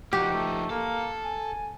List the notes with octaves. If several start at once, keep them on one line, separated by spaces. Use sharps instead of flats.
F3 D#4 F#4 G4
A3
A#3 A4
G#5